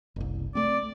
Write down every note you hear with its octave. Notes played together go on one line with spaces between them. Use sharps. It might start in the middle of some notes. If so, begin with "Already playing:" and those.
F#1 C2
A3 C4 D5